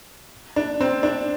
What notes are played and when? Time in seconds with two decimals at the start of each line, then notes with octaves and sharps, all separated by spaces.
0.56 D4
0.80 C4
1.03 D4